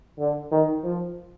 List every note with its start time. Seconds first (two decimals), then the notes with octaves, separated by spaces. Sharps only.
0.19 D3
0.51 D#3
0.84 F3